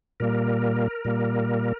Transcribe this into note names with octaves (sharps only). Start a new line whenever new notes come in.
A#2 G3 A#3 A#4
A#2 G3 A#3